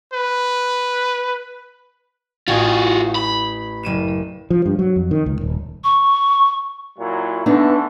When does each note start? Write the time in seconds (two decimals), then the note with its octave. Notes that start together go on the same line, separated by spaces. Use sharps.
0.14 B4
2.48 A1 F4 F#4 G#5 D#6
3.15 B5
3.83 F#1 D#7 E7
4.50 F3
4.66 G2
4.79 F#3
4.96 F2
5.11 D#3
5.26 C#2
5.41 D#1
5.84 C#6
6.98 A#2 F#3 E4
7.46 D3 E3 A3 B3 D4 D#4